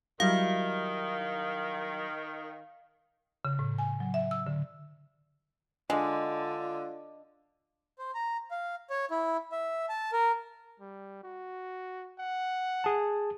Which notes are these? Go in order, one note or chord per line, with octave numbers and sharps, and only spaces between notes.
D#3 F#3 G3 E4 F5
C#3
A2
G#5
F#3
E5
E6
D3
D3 G#3 D4 F4 D5 D#5
C5
A#5
F5
C#5
E4
E5
A5
A#4
G3
F#4
F#5
G#4 A5